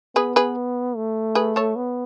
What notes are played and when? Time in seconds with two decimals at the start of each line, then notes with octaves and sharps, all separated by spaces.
0.16 B3 G#4 B4
0.36 G#4 B4
0.96 A3
1.35 G#4 B4
1.56 A4 C#5
1.75 B3